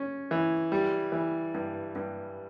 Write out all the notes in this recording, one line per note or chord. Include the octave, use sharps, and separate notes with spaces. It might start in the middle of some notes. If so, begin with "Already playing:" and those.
Already playing: C#4
E3
G3
E3
G2
G2